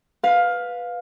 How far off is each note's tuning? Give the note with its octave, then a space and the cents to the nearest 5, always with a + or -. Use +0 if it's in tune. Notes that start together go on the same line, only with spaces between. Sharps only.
B4 +0 F5 +15